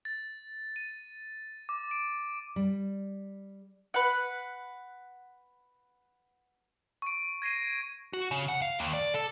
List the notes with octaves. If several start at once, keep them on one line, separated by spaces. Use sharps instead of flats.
A6
D#7
D6
D7
G3
B4 F#5
C#6 D7
G#6 A#6 C7 D#7
F#4
C#3
F#5
F5
D#2
D5
A4